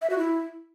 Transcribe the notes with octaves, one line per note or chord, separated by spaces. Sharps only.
E5
F#4
E4